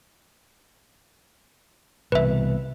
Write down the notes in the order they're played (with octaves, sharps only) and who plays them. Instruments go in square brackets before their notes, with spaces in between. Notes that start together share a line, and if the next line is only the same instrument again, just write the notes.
[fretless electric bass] C2 B2 E3 [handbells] B4 E5